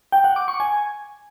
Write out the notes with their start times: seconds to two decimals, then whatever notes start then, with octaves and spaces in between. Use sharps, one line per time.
0.12 G5
0.24 F#5
0.36 D6
0.48 C#6
0.60 G#5